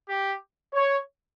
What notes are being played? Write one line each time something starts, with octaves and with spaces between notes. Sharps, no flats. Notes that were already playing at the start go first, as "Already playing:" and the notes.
G4
C#5